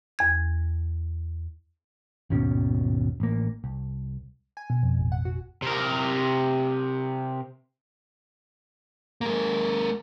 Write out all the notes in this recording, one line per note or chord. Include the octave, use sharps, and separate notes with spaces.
E2 G#6
G#1 D#2 B2 C#4
A1 A#3
C2
G#5
B2
F2
A1
F#5
F#4
C3 A#4
G#3 A#3